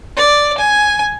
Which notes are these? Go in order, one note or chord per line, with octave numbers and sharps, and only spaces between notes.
D5
G#5